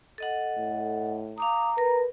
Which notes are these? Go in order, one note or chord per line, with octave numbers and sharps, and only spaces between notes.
A4 D#5 F#5
A2
F5 A#5 D6 D#6
A#4 B4